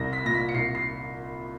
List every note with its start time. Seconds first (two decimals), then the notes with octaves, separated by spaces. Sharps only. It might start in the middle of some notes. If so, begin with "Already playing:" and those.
Already playing: C2 A#6
0.13 B6
0.23 A#2 A#6
0.34 B6
0.49 C#7
0.54 C2 C7
0.75 C7